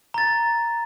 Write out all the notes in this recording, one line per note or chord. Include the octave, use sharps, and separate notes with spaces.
A#5 A6